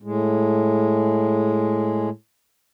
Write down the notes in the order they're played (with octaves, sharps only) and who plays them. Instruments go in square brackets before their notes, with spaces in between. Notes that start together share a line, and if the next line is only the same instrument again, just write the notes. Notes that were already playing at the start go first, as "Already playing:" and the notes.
[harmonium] A2 G#3